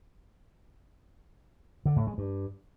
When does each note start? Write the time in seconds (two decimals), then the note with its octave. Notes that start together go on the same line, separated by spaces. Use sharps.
1.85 D3
1.96 A2
2.07 G#3
2.18 G2